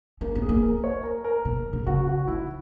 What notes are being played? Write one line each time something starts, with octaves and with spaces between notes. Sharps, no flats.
A#3 C#4
B3
G#4
A#3
A#4
C#5
A#4
A#4
B2
B2
C#3 F#4
F#4
D#3 E4